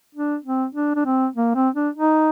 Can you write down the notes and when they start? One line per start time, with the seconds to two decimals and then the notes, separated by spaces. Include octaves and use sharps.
0.15 D4
0.45 C4
0.75 D4
0.96 D4
1.06 C4
1.36 A#3
1.55 C4
1.75 D4
1.96 D#4